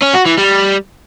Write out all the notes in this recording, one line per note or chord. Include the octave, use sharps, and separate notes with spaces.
C#4
F#4
E3
G3